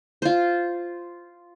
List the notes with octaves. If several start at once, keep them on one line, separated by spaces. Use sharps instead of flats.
F4 C5